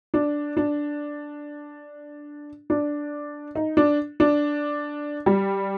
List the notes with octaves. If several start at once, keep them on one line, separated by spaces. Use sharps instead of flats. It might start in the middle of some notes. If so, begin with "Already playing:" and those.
D4
D4
D4
D#4
D4
D4
G3